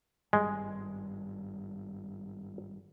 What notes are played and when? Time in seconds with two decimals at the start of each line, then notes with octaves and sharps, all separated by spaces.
0.33 G#1 G2 G3 G#3